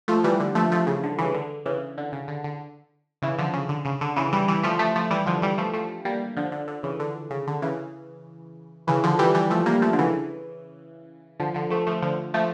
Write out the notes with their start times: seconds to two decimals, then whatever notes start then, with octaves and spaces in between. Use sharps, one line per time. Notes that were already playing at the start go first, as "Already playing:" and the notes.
0.08 F3 A3
0.24 E3 G3
0.40 D3
0.55 F3 A3
0.71 F3 A3
0.87 C#3
1.03 D3
1.18 C#3 E3
1.34 D3
1.66 C#3 E3
1.98 D3
2.12 C#3
2.28 D3
2.44 D3
3.22 C#3 E3
3.38 D3 F3
3.53 C#3
3.69 D3
3.85 C#3
4.01 D3
4.16 C#3 E3
4.33 E3 G3
4.48 E3 G3
4.63 F3 A3
4.79 F3 A3
4.96 F3 A3
5.11 E3 G3
5.26 D3 F3
5.42 E3 G3
5.58 F3 A3
5.73 F3 A3
6.05 G3 A#3
6.37 D3 F3
6.52 D3
6.68 D3
6.83 C#3 E3
7.00 D3
7.30 C#3
7.47 D3
7.62 C#3 E3
8.87 C#3 E3
9.03 D3 F3
9.19 E3 G3
9.35 E3 G3
9.50 F3 A3
9.66 G3 A#3
9.82 F3 A3
9.93 D3
9.99 C#3 E3
11.40 D3 F3
11.54 D3 F3
11.70 F3 A3
11.87 F3 A3
12.02 D3 F3
12.34 F3 A3